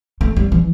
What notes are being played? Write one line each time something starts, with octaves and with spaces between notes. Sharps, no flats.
A3
G3
E3